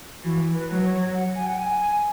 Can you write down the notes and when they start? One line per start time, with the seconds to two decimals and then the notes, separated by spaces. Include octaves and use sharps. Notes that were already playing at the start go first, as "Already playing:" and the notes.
0.23 E3 F#4
0.54 B4
0.68 F#3
0.84 C#5
1.14 F#5
1.35 G#5
1.47 F#5
1.59 G#5
1.80 G#5